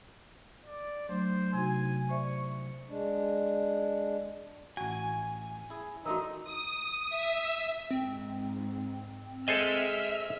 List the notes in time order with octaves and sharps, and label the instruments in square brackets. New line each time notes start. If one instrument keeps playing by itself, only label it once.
[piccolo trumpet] D5
[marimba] F#3 A3 D4 [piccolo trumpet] C5
[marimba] C3 D#4 F#4 [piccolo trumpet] G#5
[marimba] C5 D5 E5 [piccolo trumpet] C#6
[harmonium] G#3 D4
[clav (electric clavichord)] A1 F#4 [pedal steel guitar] G#5 [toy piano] A5
[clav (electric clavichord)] E4 G#4
[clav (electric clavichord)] E3 A3 D4 [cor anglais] D#4 [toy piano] F#4 A#4
[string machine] D#6
E5
[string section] G#2 [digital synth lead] C4
[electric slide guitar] G#4 D#5 [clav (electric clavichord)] A4 C5 G#5 [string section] E5 E6 F6